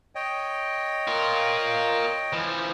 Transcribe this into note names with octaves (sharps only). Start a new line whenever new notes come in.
C#5 D#5 G5
F4 A#4
E3 F3